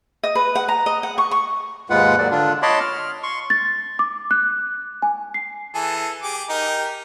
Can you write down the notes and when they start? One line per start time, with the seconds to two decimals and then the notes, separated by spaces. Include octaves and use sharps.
0.23 D#5
0.35 B4
0.55 F#5
0.68 A#5
0.86 D#5
1.03 F#5
1.18 C#6
1.31 C#6
1.90 D#2 G#2 G#3 F4 B4 F#5
2.18 G#2 D#3 F#3 D5
2.31 D3 D4 F4
2.62 C#5 D#5 A5 B5 C6 D6
2.80 F6
3.23 C6 C#6
3.50 A6
3.99 D6
4.31 F#6
5.02 G#5
5.34 C7
5.75 E3 G#4 A4
6.23 G4 G#4 D6
6.49 D#4 G4 A#4